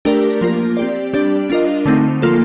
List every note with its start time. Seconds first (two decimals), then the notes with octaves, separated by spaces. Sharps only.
0.05 A3 D4 G4 A#4 D5
0.41 F3 A#3 F4 A#4
0.77 C4 G4 D5
1.13 G3 D4 G4 D5
1.50 D4 F4 A#4 D#5
1.86 D3 A3 C4 D#4
2.22 F3 A#3 F4 A4